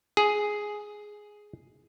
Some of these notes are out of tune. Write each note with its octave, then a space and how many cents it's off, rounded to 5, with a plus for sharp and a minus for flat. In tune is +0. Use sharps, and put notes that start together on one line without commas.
G#4 +5